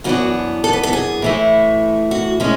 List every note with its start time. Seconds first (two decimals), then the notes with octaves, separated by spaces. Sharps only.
0.04 F#2 E3 B3 D4 F#4
0.64 A4
0.73 B4
0.83 A4
0.93 G#4
1.22 A2 E3 A3
2.11 F#4
2.40 A2 G#3 C#4